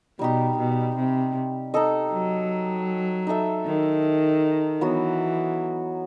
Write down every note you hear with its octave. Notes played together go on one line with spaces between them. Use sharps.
B2 G3 D#4 G4
B2
C3
D#4 A4 D#5
F#3
D#4 A4 E5
D#3
E3 F#3 B3 F#4